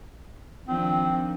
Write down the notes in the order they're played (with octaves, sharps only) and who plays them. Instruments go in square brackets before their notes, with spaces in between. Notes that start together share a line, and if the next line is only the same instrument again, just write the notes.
[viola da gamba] D#3 F3 D4 [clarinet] C4